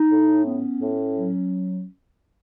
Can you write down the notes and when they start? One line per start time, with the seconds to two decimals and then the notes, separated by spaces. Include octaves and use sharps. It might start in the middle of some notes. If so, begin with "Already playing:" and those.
Already playing: D#4
0.10 A2
0.45 B3 C#4
0.80 A2
1.15 F#3